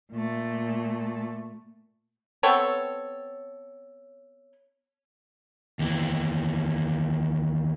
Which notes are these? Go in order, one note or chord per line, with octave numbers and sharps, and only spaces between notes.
A#2 A3
B3 C4 A4 C#5
D#2 E3